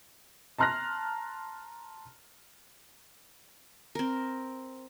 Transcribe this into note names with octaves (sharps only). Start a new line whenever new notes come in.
A5 A#5 C6 F6 F#6 A#6
C4 A#4